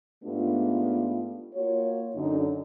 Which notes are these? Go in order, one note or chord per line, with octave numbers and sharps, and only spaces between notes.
G#2 A3 B3 D4 F4 G4
A#3 F4 F#4 C#5
F#2 D3 D#4